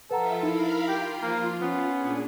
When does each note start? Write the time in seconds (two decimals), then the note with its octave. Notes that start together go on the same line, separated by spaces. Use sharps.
0.11 F3 F4 A4 B4 E5 F#5 A#5
0.43 D#4 E4 A#4 F5 B5
0.88 F4 G4
1.22 F3 A#3
1.62 B3 C#4
1.97 A#2 D4 G#4